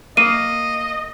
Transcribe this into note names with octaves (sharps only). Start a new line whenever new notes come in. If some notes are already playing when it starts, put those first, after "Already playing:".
A#3 D#5 D#7